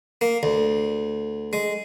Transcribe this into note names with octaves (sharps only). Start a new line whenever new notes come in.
A#3
D2
G#3